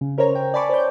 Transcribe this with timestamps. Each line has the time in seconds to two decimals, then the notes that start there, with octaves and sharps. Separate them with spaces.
0.01 C#3
0.18 C#4 A#4 C5 C#5 A#5
0.35 G5
0.54 D5 G#5 A5 B5 C#6 D6
0.69 C5 C#5 G6